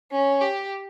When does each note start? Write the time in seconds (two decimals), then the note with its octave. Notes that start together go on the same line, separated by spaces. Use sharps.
0.12 C#4
0.41 G4